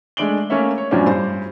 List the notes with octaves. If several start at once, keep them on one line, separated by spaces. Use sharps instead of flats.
G#3 A3 D4 D7 F#7 G7
A3 A#3 C#4 C#5 E5
C#5
F#2 A2 F3 C#4 D4
G2 C5